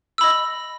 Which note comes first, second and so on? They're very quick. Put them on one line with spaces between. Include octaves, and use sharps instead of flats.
E6 B5 D#5